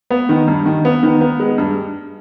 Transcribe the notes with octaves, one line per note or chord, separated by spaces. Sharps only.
B3
D#3
G2
D#3
B3
D#3
B3
G#3
G2